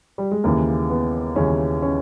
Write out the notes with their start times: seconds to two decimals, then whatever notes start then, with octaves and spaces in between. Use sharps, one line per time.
0.18 G3
0.31 G#3
0.44 D#2 C#3 E3 A#3
0.90 B3
1.36 D#2 C#3 E3 C#4
1.82 C#4